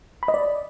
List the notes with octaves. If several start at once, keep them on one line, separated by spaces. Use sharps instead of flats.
B5
D#5
D5